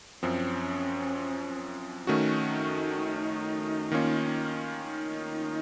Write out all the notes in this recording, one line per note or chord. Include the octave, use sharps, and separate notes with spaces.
F#2 F3 C4 C#4
D#3 A3 C#4 D#4 F#4
D#3 A#3 C#4 F4
D#4